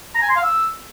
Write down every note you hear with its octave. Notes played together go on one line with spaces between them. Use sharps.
A#5
G#5
C6
F5
E6